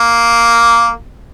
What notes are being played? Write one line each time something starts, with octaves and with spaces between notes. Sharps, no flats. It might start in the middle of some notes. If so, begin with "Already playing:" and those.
Already playing: A#3